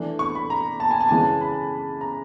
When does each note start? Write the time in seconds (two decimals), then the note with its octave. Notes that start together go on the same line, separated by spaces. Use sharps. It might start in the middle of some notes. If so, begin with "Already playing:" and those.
Already playing: E3 A3 D4
0.19 C#6
0.35 B5
0.50 A#5
0.80 A5
0.91 G#5
1.01 A5
1.09 C#3 E3 G#3 C#4 G#5
1.18 A5
1.41 B5
2.01 A#5